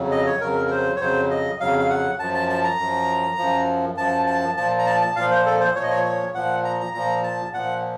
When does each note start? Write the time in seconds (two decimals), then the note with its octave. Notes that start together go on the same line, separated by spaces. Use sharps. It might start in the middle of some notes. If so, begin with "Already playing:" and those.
Already playing: F2 C#3 F#3
0.11 D#5
0.26 C#5
0.41 F2 C#3 F#3 A#4
0.66 A#4
0.71 C5
0.96 C#5
1.00 F2 C#3 F#3 C5
1.30 D#5
1.60 F2 C#3 F#3 F5
1.79 F5
1.90 F#5
2.19 F#2 F3 A5
2.34 A5
2.49 A5
2.64 A#5
2.78 F#2 F3
3.38 F#2 F3
3.97 F#2 F3 A5
4.27 A5
4.57 A#2 F3 A5
4.79 A#5
4.86 A5
5.01 A5
5.16 A#2 F3 F5
5.31 C5
5.46 A4
5.60 C5
5.75 A#2 C#5
5.79 F3 D#5
5.90 C#5
6.04 C#5
6.35 A#2 F3 F#5
6.64 A#5
6.80 A#5
6.94 A#2 F3 A#5
7.24 A5
7.53 A#2 F3 F#5